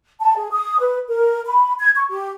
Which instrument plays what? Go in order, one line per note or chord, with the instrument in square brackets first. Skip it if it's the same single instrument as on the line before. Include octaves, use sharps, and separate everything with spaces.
[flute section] A5
G#4
D#6
B4
A#4
B5
G#6
C#6
G4